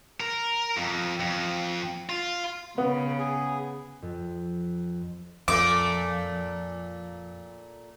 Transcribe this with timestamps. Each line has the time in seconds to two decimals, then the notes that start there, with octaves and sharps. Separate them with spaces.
0.20 A#4
0.77 F2
1.20 F2
2.09 F4
2.78 C#3 B3
3.19 G#4
4.02 F2
5.48 F2 A#2 A3 D6